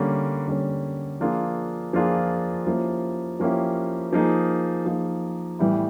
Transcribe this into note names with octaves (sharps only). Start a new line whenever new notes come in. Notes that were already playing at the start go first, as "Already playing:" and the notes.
Already playing: D3 G3 A#3 C#4
D3 G3 A#3 C#4
F3 A#3 D4 F4 G#4
F3 A#3 D4 F4 G#4
F3 A#3 C#4 E4 G4
F3 A#3 C#4 E4 G4
F3 A#3 D#4 G#4
F3 A#3 D#4 G#4
A2 E3 G3 B3 E4